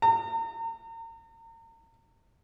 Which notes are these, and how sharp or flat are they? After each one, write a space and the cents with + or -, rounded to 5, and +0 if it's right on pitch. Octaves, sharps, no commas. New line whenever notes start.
A#5 -35